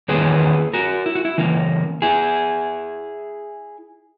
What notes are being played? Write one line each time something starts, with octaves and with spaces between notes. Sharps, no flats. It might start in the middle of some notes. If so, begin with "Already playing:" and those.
E2 D#3 A#3 C#4 G#4 B4
F#4 A#4
E4
F#4
E4
C#3 E3 A#3
E4 G#4